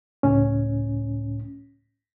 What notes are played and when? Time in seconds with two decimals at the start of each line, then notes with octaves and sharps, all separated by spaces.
0.23 C#2 A2 C#4